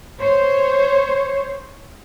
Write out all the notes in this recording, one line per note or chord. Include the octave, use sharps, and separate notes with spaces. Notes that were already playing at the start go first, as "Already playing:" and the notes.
C5 C#5